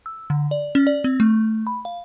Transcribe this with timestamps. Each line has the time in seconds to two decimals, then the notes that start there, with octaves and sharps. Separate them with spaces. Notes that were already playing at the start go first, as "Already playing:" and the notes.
0.06 E6
0.30 D3
0.51 D5
0.75 C#4
0.87 D5
1.04 C4
1.20 A3
1.67 B5
1.85 F5